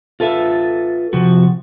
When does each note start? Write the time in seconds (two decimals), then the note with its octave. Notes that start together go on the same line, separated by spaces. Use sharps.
0.20 F4 A4 B4 E5
1.13 C3 F3 F#4